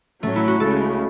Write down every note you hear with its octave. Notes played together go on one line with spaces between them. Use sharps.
A2 F#3 A3 C#4
E4
F#4
C#2 C#3 G#3 A4